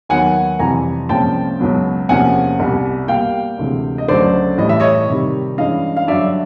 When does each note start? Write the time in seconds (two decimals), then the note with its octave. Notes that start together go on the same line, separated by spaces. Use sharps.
0.09 D#2 D#3 F#3 B3 F#5 G#5
0.59 F2 C3 E3 G3 G#5 A#5
1.09 C2 A#2 F3 G#3 C#4 G5 A5
1.60 C#2 B2 F#3 B3
2.09 E2 C3 F3 A#3 C#4 F#5 G#5
2.60 C2 B2 G3
3.08 B2 G3 A#3 F5 G5
3.58 D2 C3 E3 G#3
3.98 D#5
4.08 D2 C#3 F#3 A3 C5 D5
4.58 A2 E3 G3 D#5
4.69 E5
4.80 C#5 D#5
5.08 C3 D#3 G3
5.57 G2 E3 G#3 C#4 D#5 F5
5.97 F5
6.07 G2 D3 F#3 D5 E5